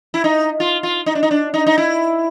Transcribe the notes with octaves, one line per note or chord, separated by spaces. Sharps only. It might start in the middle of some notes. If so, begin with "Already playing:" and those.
E4
D#4
F4
F4
D#4
D4
D#4
D4
D#4
D#4
E4